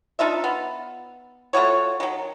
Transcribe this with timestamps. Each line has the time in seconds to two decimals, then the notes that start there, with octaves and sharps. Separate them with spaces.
0.19 D4 D#4 F4 E5
0.44 B3
1.53 A3 F4 F#4 C#5
2.00 D#3 F#3